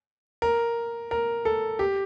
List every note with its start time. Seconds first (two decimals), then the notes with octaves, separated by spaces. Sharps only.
0.42 A#4
1.11 A#4
1.45 A4
1.79 G4